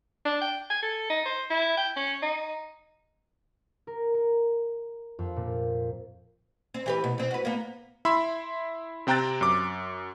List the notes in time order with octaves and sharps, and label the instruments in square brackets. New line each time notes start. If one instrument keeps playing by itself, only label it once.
[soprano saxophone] D4
G5
G#5
A4
D#4
C5
E4
G5
C#4
D#4
[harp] A#4
A#4
F2
A#2
[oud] C4
E3 G4 B4
B2
B2 C4
F#4 B4
A#3 B3
[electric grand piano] E4 E5 B5 C6
C3 C4 G5 A#5 F#6 A6
F#2 D6